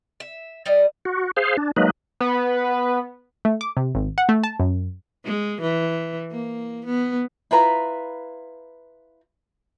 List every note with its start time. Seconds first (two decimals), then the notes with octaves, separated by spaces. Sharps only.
0.20 E5
0.66 G3 D5 D#5
1.05 F#4
1.37 G#4 C5 F5
1.57 D4
1.77 F#3 G#3 A#3 D#4 B4
2.20 B3 B4
3.45 A3
3.61 D6
3.77 C3
3.95 G#1
4.18 F#5
4.29 A3
4.44 A5
4.60 F#2
5.25 G#3
5.61 E3
6.31 A#3
6.86 B3
7.51 E4 F4 B4 A#5